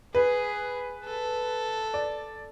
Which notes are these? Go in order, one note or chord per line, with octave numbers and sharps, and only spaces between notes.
G#4 B4
A4
D5